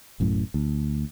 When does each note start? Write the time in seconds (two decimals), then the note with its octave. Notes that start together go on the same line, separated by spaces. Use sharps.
0.20 D1 F#2 A2
0.54 D2